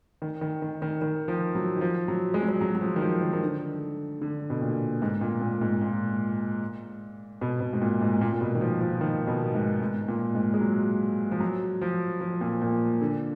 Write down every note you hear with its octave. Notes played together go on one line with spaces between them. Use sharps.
D#3
D#3
D#3
D#3
D#3
F3
F#3
D#3
F3
F#3
G#3
F#3
G#3
F#3
F#3
F3
D#3
F3
D#3
D#3
D3
D3
B2
A#2
G#2
A#2
A#2
G#2
A#2
B2
B2
G#2
A#2
G#2
A#2
A#2
B2
D#3
F3
F3
D#3
B2
G#2
G#2
A#2
G#2
G#3
F#3
F3
F#3
F3
F3
A#2
A#2
D3